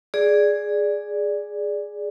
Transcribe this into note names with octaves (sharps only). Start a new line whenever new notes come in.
G#4 D5